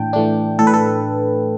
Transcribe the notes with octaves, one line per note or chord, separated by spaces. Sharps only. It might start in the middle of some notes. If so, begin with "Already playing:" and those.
Already playing: A2 E3 D4 G5 A5
E3 A3 D4
A2 A4
B4
A4